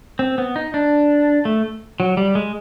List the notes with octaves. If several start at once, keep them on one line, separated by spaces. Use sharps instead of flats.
C4
B3
D#4
D4
A3
F#3
G3
G#3